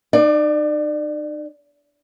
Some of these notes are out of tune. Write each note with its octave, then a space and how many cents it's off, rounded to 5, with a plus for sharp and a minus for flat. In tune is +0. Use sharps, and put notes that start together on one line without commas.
D#4 -35 D5 +25